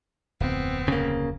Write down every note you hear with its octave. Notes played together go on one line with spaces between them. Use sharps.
D1 F2 B3 C4
C#3 A#3